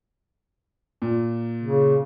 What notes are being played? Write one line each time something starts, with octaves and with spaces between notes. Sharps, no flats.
A#2
C#3